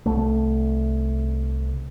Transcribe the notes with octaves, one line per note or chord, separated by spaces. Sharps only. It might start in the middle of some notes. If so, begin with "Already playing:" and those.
C2 A3